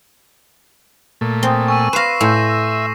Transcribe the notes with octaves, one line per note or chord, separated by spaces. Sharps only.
A#2 A3
C4 G#5 C6 D#6
G#5 C#6 E6 D#7
B4 F5 C6 C#6 A#6 C7 E7
A2 E5 G#5 C6 G6